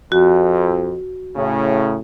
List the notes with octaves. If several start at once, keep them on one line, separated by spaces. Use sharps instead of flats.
F2 F#4
A2 C#3